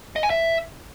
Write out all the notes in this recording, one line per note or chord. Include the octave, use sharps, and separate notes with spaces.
D#5
G#5
E5